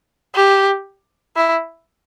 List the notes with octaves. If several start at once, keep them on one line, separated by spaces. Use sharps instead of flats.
G4
E4